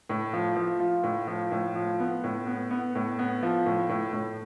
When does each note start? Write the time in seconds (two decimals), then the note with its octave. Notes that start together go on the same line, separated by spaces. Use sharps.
0.09 A2
0.33 F3
0.56 F3
0.80 F4
1.04 A2
1.27 F3
1.51 A2
1.75 F3
2.00 B3
2.24 A2
2.47 B3
2.71 B3
2.95 A2
3.19 B3
3.43 F3
3.66 A2
3.89 A2
4.13 A2